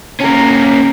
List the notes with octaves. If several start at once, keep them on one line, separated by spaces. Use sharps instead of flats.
A#3 C#4 A#4